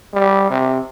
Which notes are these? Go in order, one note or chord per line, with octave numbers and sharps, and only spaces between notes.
G3
C3